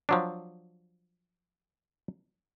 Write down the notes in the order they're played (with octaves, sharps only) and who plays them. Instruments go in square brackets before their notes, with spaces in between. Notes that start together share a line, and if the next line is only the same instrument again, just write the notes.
[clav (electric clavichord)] F3 F#3 D4